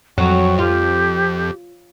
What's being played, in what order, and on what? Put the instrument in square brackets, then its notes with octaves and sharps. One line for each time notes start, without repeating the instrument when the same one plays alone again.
[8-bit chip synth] F2 [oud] F#3 [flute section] F#5 G5 C#6
[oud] F4 [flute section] G4